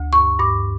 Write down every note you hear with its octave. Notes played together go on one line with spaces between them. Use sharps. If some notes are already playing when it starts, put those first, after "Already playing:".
Already playing: D2
G2 C#6
G2 D6